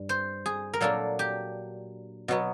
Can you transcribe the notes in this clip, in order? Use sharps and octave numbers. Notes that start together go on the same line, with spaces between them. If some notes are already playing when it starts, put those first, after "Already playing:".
Already playing: G2
C5
G#4
A#4
A#2 F#3 A#3 D4 A4
G4
B2 F#3 B3 F#4